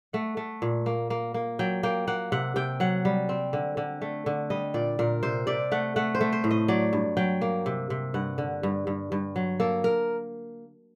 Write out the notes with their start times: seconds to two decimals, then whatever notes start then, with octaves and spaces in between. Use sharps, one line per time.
0.13 A3 F#5
0.37 A3
0.62 A#2
0.86 A#3
1.10 A#3
1.34 A#3
1.59 F#3 G5
1.83 A#3 G5
2.07 A#3 F#5
2.32 C3 F#5
2.56 C3 G5
2.80 F#3 F#5
3.05 G3
3.29 C4
3.53 D3
3.77 D3
4.02 A3
4.26 D3
4.50 G3 D#5
4.74 A#2 D5
4.99 A#2 A#4
5.23 C3 C5
5.47 C3 D5
5.72 A3 F#5
5.96 A3 F#5
6.15 C5
6.21 A3
6.33 C5
6.44 A2
6.51 D#5
6.68 F#3 D5
6.93 G2
7.17 F#3 G5
7.41 A#3
7.66 C3
7.90 C3
8.14 G2 F#5
8.38 D3
8.63 G2
8.87 G2
9.12 G2
9.36 F#3
9.60 A#3 A4
9.84 A#4